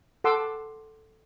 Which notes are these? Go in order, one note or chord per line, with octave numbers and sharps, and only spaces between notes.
A4 F#5 C6 D6 E6